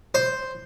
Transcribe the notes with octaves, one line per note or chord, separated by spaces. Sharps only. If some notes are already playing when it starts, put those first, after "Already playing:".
C5